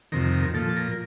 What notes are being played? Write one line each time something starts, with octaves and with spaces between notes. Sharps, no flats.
F2 C3 D#3 A#4
A#2 F3 A4
A#4